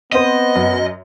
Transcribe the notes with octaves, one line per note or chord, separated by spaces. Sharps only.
B3 C4 C5 D#5
F#2